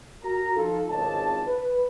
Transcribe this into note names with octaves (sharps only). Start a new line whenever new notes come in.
F#4 A#4 A#5
F3 D#4 F4 A4
G#1 C#2 A5
B4